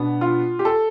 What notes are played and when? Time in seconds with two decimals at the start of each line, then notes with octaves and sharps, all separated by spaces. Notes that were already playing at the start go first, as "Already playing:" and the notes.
Already playing: B2 B3 D4
0.21 F4
0.59 G4
0.65 A4